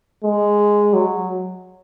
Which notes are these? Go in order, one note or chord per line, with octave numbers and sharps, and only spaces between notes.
G#3
F#3